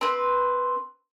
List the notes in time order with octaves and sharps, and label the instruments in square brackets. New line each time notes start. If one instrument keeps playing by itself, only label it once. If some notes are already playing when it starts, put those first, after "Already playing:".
[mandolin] C4 B4